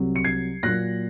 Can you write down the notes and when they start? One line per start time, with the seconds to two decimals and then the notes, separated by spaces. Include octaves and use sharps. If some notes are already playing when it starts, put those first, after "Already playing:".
Already playing: C2 C3 F#3
0.16 C#7
0.24 G#6 C7
0.63 A#2 F#3 A#3 F#6 A#6